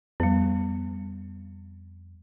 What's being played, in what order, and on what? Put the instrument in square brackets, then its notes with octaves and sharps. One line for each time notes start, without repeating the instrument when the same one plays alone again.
[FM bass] F2 [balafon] G3 B3